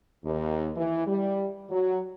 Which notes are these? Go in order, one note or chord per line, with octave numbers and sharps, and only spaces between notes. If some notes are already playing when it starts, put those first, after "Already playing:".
D#2
E3
G3
F#3